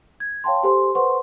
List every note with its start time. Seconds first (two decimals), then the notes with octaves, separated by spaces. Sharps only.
0.20 G#6
0.44 C#5 F5 G5 A5 C6
0.63 G4 A4 C5 G#5 C6
0.95 A4 B4 C5 F#5 C6 C#6